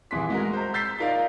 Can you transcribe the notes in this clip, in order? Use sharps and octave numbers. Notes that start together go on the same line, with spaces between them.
D#1 E3 G#4 C6 B6
G#3 F#4 A#4
C5 A#5
E6 G6 A6 B6 C7
D#4 F4 A#4 D5 F5